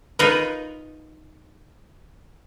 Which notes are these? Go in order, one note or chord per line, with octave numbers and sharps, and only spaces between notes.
D#4 F4 A#4 B4 D#5